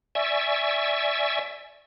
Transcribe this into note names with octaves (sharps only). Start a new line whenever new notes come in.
D5 E5 G#5 C#6 E6